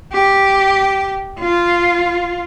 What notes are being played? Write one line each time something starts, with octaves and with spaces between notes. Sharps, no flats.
G4
F4